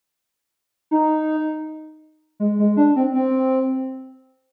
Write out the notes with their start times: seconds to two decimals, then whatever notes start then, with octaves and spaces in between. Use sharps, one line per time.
0.91 D#4
2.40 G#3
2.59 G#3
2.77 D4
2.96 C4
3.14 C4